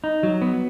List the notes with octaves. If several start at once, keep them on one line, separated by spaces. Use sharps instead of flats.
D#4
F#3
B3